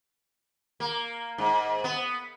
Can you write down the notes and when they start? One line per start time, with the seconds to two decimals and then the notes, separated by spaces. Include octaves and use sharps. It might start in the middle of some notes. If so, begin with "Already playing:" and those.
0.80 A#3
1.38 G#2
1.84 B3